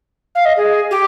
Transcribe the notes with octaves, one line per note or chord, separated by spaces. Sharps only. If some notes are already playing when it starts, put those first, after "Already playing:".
F5
D#5
G#4
G4